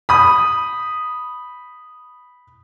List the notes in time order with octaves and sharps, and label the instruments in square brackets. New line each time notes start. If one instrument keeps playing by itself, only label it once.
[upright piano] B5 D#6